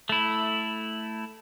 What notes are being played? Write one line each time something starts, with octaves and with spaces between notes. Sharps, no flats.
A3 E4